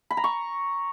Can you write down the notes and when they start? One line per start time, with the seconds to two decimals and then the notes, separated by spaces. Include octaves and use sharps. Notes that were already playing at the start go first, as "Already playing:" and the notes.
0.11 B5
0.17 A#5
0.24 C#6